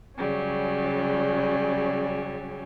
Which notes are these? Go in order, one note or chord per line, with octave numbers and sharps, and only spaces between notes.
C#3 F#3 G3 C#4